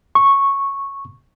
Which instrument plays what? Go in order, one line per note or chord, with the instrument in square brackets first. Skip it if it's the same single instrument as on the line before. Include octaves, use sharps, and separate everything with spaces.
[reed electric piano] C#6